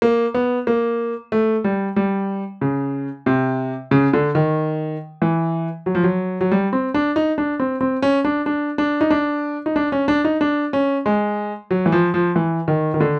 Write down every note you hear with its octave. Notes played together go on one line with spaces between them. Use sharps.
A#3
B3
A#3
A3
G3
G3
C#3
C3
C#3
D3
D#3
E3
F#3
F3
F#3
F#3
G3
C4
D4
D#4
D4
C4
C4
C#4
D4
D4
D4
D#4
D4
D#4
D4
C#4
D4
D#4
D4
C#4
G#3
F#3
E3
F3
F3
E3
D#3
D#3
D3